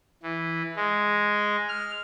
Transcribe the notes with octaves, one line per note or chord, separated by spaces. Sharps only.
E3
G#3
F6